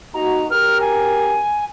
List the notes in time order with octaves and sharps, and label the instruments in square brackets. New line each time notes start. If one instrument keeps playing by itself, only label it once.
[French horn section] A#3 D#4 F#4 [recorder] A#5
[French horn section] F#2 G4 A#4 [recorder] F6
[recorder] G#5